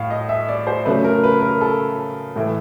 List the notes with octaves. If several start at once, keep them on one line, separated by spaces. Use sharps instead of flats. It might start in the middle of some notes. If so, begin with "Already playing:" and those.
Already playing: A2 A3 F5
D#5
E5
D5
C5
C#3 F#3 A3 B4
A#4
B4
A#4
A4
A2 E3 A3